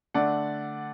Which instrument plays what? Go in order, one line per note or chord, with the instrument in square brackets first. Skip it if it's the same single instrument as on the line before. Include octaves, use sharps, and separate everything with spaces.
[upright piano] D3 A3 D4 D5 F#5